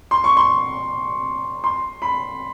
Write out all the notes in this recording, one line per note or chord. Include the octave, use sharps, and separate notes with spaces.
C6
C#6
C6
C6
B5